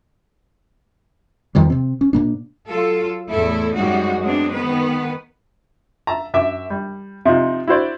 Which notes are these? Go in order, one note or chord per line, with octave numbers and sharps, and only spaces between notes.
E2 D#3 F3 G3
C3 C4
C#4
A#2 A#3 D4
F#3 F4 A4
E2 A2 E4 A4
F#2 G3 G#3 D#4 F#4
F#3 G#3 B3 C4 D4
D#3 B3 B4
E5 A5 A#5
F#2 E5 D6
G3
C3 F3 D#4 F4
E4 F#4 C5 D5